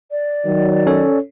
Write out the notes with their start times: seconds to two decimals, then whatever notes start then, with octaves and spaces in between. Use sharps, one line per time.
0.11 D5
0.46 D#3 F#3
0.87 C#4 A4 C#5